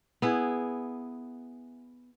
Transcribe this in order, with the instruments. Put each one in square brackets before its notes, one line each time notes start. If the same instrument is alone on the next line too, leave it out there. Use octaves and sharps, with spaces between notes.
[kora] B3 E4 G#4